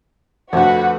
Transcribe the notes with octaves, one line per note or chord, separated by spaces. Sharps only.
F2 D3 F3 A3 F#4 B4 F#5